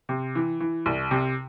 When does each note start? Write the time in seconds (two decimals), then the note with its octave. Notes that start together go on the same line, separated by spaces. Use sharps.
0.09 C3
0.35 E3
0.60 E3
0.86 C2
1.11 C3